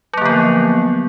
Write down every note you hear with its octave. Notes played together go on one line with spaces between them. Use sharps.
D3 F3 F#3 A#3 B3